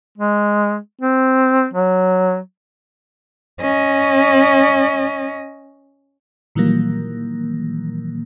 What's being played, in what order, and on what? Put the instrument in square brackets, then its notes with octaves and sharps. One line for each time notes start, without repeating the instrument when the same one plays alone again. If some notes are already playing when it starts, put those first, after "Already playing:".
[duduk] G#3
C4
F#3
[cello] C#4 D#5
[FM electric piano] A#2 D#3 E3 F#3 G3 A#3